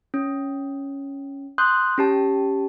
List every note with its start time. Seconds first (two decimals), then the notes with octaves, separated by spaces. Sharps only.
0.14 C#4
1.58 C6 D#6 F#6 G6
1.98 C#4 G4 A5